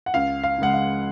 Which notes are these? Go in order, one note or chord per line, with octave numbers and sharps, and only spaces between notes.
F#5
C#2 F5
F5
C#3 G#3 F#5
F5